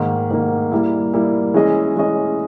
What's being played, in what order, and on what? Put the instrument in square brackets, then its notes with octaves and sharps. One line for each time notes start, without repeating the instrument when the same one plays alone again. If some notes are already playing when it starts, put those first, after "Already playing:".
Already playing: [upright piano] G#2 D#3 A#3
G#2 D#3 A#3
G3 A#3 E4
G3 A#3 E4
E3 G#3 C#4 G#4 D#5
E3 G#3 C#4 G#4 D#5